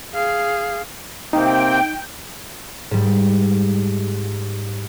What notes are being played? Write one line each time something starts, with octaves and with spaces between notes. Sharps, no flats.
G#4 F5
C3 A#3 C4 D#4 G5
G#2 G3